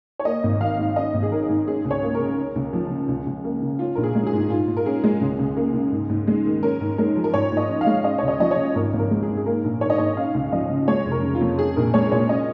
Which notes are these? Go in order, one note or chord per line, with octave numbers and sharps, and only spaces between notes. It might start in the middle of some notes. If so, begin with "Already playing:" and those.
C#5
A#3 D#5
G#1
D#3 F5
G#2
C#4 D#5
G#1
G#4
D#3 A#4
G#2
C#4 G#4
C#2
C#5
A#3
A#4
C#3
C#4
C#2
F3
C#3
C#2
C#2
A#3
C#3
C#4 F4
A#1 A#4
G#4
G#3
G#4
G#2
G#2 F4
G#2
A#4
C#4 G#4
G#3
C#2
C#2
A#3
C#3
G#2
G#2
G#3
D#3
C#4 A#4
G#2
G#3 A#4
F3
A#4
G#2 C#5
G#2
D#5
C#4
F5
G#3
C#4 D#5
C#2 C#5
D#5
F3 D#5
C#5
C#3
G#1 A#4
G#1
A#4
G#3
G#4
G#2
G#4
A#3 A#4
A#1
D#3 C#5
D#5
G#2 C#5
C#4 F5
C#2
F3 D#5
C#3
G#3 C#5
F1
A#4
C#3
F4
F2
C#4 G#4
A#1 A#4
G#3 C#5
A#2 C#5
C#4 D#5